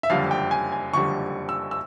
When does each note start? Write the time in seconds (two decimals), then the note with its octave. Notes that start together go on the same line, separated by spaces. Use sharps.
0.03 E5
0.10 F#1 F2 D3 G3 F5
0.31 G5
0.51 G#5
0.72 G#5
0.93 F#1 F2 D3 G3 C#6
1.49 E6
1.71 E6